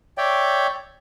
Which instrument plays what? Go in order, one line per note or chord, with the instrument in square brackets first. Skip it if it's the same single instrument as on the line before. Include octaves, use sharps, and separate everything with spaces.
[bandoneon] C#5 D5 E5 G5